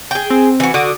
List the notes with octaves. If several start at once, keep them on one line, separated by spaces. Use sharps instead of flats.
G#4 G5
C4
E3 F#4
D3 F#4 D6 D#6